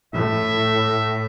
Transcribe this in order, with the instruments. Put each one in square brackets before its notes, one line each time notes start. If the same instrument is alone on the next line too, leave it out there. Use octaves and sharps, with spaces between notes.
[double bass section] A2 [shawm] E5